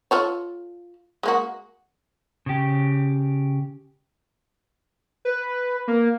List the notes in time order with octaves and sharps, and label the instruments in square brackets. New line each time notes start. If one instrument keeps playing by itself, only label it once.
[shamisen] F4 A4 C#5
G#3 A#3 F#4
[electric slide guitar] C#3 G4
[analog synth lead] B4
A#3